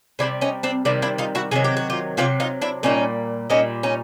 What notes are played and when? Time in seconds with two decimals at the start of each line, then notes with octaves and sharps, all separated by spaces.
0.19 C3 D#3 G3 D4 E4
0.41 C#4 D#4
0.63 C4 D4
0.85 C3 D#3 G3 D4 E4
1.02 D4 E4
1.18 D#4 F4
1.35 E4 F#4
1.51 C3 D#3 F#3 G#4
1.64 G4
1.77 F#4
1.90 F4 G4
2.17 C3 D#3 F#3 F4 G4
2.40 D#4 F4
2.61 D4 E4
2.83 A#2 G3 C#4 D#4
3.50 A#2 G3 C#4 D#4
3.83 C#4 D#4